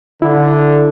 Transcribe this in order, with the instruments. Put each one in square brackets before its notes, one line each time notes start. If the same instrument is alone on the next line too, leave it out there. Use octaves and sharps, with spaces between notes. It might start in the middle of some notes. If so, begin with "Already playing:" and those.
[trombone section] D3 [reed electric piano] E4